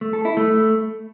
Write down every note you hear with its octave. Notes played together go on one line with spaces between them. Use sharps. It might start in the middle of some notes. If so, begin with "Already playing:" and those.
A3
A4
E4
A3